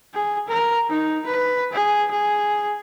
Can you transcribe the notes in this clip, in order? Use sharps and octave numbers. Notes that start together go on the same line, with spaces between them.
G#4
A#4
D#4
B4
G#4
G#4